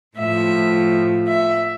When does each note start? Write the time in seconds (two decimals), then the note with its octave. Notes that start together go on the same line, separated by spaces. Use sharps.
0.18 A2 F3 E5
1.27 E5